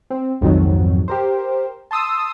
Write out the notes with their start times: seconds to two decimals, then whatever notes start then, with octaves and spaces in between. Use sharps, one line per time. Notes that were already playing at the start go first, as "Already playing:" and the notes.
0.10 C4
0.41 B1 F2 G#2 D#3 F3 F#3
1.08 G4 A#4 C5
1.91 A5 C6 D#6 E6